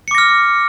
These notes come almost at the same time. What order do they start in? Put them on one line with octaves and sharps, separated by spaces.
C#7 D6 A#6 F6